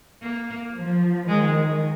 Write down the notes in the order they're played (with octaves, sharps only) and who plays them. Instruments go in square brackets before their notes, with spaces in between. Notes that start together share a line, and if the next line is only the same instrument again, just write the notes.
[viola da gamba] A#3
[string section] F3
[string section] D#3 [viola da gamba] G#3